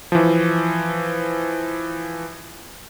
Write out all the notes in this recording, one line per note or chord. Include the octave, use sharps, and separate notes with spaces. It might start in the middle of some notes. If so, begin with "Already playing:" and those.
E3 F3